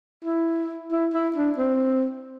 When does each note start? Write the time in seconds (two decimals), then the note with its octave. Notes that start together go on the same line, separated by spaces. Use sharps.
0.25 E4
0.92 E4
1.14 E4
1.36 D4
1.58 C4